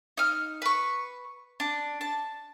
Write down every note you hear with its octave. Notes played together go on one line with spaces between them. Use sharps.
D#4 F6
B4 C#6
D4
A5